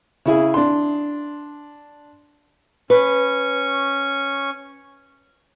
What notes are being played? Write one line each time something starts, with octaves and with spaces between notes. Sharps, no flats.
C#3 E4 G#4
D4 C6
C#4 B4 C#6